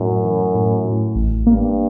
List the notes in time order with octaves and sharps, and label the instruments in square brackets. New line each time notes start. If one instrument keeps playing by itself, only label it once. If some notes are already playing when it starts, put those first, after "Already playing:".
Already playing: [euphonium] F#2 [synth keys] A2
[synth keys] E3
A2
A2
A1
[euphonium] G2 [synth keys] A#3